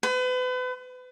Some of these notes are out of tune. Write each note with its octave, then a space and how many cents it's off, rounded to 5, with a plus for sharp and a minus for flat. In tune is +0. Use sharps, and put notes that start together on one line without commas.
B4 +35